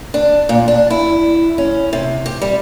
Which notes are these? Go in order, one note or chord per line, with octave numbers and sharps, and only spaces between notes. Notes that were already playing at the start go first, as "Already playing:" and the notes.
D4
A#2
D4
E4
C#4
C3
G4
G3